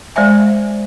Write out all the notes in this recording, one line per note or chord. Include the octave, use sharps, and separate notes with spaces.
G#3 C5 D5 E5 G#5